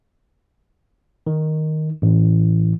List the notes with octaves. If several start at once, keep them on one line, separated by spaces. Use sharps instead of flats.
D#3
A1